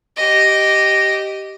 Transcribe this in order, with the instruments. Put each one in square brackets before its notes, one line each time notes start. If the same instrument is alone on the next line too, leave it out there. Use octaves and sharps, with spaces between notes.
[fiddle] G4 D#5